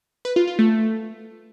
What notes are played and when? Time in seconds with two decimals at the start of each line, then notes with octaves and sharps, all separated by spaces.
0.25 B4
0.36 F4
0.47 F4
0.59 A3